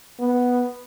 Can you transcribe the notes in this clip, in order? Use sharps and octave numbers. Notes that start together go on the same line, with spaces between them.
B3